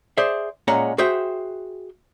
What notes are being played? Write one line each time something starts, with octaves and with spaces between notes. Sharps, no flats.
G#4 C5 D5 E5
A#2 G#3 C#4 F#5 A#5
F#4 G#4 C5 E5 G5